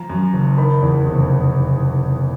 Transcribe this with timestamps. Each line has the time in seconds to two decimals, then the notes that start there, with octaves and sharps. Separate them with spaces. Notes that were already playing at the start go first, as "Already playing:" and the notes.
Already playing: F3 A#5
0.10 F#2
0.33 F#1
0.57 D#3 B5
0.82 E2
1.07 F1